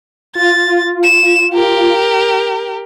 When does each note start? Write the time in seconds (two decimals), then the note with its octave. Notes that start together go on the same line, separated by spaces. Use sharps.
0.35 F4 A6
1.04 E7
1.54 G4 A#4